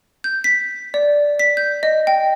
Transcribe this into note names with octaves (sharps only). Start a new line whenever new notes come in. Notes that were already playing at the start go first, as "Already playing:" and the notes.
G6
B6
D5
B6
G6
D#5
G5